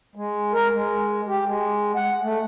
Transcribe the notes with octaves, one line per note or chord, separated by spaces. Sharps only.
G#3
A#4
G#3
G4
G#3
F#5
A3